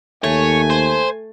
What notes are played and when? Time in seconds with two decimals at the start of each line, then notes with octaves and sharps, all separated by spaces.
0.24 D#2 A3 C#5 G#5
0.70 C5